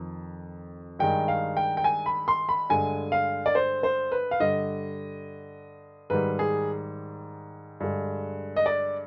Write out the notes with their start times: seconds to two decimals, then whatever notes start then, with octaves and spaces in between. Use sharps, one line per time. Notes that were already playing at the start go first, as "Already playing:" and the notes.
Already playing: F2 D#3
0.99 G2 D#3 G#3 G5
1.28 F5
1.57 G5
1.77 G5
1.84 G#5
2.06 B5
2.28 C6
2.49 B5
2.69 G2 D3 G#3 G#5
3.12 F5
3.46 D5
3.55 C5
3.83 C5
4.12 B4
4.31 F5
4.40 G2 D3 G3 D#5
6.10 G#2 D#3 G3 B4
6.39 G#4
7.80 G2 D3 G#3
8.56 D#5
8.66 D5